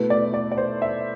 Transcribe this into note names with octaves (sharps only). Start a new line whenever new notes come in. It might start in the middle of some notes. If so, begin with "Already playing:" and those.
Already playing: B2 A3 E4 B4
D5
D5
D5
C5
E5